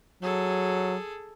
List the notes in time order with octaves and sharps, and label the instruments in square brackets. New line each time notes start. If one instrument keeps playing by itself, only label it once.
[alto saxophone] F#3 [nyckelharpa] G#4 A4